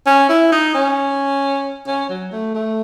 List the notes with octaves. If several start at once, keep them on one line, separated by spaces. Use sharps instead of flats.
C#4
E4
D#4
C#4
C#4
F#3
A3
A3